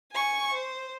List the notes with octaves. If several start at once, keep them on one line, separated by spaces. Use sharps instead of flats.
G#5 C#6
C5